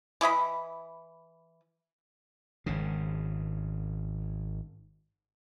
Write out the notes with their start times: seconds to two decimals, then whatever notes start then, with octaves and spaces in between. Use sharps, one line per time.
0.21 E3 E4 D#5 B5
2.66 G#1 C#3